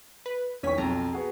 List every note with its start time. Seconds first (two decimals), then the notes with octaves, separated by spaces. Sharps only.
0.26 B4
0.63 B1 E2 D#3 C#4 C#6 B6
0.78 B1 F2 A#5
1.13 B3 F#4 G#4